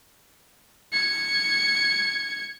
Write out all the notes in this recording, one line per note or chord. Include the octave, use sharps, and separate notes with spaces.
G#6 C#7